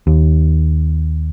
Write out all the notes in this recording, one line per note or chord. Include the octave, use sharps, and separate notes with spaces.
D#2